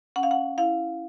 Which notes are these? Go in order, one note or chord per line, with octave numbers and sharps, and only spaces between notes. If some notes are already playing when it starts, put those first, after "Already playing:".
C#4 F#5
F5
F#5
E4 F5